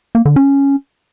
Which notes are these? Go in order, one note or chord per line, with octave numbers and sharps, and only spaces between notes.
A#3
D3
C#4